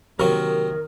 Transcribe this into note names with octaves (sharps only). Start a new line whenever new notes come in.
C3 D#3 F#3 A#3 A#4 C#6